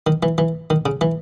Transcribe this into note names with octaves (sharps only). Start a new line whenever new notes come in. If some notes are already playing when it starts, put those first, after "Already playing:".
D#3
E3
E3
D#3
C#3
E3